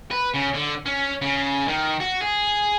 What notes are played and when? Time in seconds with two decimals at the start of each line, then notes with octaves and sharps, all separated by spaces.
0.11 B4
0.35 C#3
0.55 D3
0.86 C#4
1.22 C#3
1.68 D#3
2.00 F#4
2.21 G#4